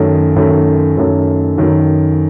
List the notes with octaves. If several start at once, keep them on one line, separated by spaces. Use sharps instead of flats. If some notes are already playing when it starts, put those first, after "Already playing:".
Already playing: F#2 D#3 A3
F#2 D#3 A3
F#2 D#3 A3
F#2 D#3 A3